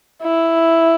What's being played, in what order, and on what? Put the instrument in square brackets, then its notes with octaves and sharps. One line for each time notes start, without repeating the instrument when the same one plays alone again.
[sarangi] E4